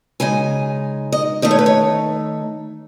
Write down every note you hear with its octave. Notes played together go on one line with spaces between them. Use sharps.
C#3 G#3 D#4 G#5
D#5
D#3 A3 D#4 D#5
C#5
B4
C#5